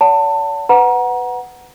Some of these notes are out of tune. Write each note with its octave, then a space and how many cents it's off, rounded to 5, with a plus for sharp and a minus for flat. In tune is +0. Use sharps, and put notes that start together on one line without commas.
C#5 +45 F#5 +0 A5 +25
B4 +15 F#5 +0 A#5 +30